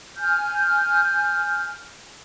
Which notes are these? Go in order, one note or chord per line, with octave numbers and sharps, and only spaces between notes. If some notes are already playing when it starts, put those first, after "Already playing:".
G#5 F6 G6